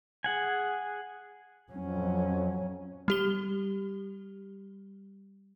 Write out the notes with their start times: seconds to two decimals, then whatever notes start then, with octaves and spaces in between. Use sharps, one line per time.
0.24 G#4 F#5 G#5
1.72 F2 F#3 C#4
3.08 G3 G4 G7